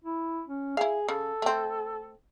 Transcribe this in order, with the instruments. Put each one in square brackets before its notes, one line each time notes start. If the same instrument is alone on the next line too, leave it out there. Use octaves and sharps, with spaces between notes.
[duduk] E4
C#4
[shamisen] E4 F5 [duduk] G#4
[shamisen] C#3 [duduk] A4
[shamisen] A3 C4